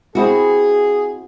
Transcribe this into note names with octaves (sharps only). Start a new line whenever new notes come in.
C4 E4 F#4 G#4